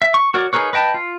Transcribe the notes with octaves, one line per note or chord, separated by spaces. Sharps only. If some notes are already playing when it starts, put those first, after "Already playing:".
E5
C#6
F#4 A#4 C#5 D5
D#4 G#4 A#4 B4 C#5
B4 D#5 G5 A5
F4